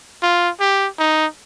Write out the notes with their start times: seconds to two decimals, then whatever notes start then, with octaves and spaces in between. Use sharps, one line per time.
0.23 F4
0.60 G4
0.99 D#4